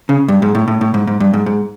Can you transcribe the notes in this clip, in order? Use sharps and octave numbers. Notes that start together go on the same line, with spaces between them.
C#3
G2
G#2
A2
A2
A2
G#2
G#2
G2
G#2
G#2